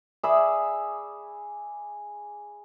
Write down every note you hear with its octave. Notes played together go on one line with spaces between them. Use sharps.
G#4 D5 E5 B5